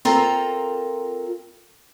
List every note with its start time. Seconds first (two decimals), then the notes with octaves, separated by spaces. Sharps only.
0.05 C4 F4 A4 A#4 A#5